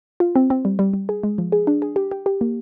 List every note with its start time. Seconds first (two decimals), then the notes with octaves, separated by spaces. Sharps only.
0.20 F4
0.36 C4
0.50 C4
0.65 G3
0.79 G3
0.93 G3
1.09 G#4
1.23 G#3
1.38 F3
1.52 G#4
1.67 D4
1.82 G#4
1.96 G4
2.11 G4
2.26 G4
2.41 A#3